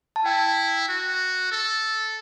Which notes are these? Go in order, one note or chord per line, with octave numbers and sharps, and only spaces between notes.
A5
E4 G5
F#4
A4